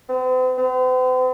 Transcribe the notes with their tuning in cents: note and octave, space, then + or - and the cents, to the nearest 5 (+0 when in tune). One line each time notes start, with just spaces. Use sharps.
C4 -45
C4 -45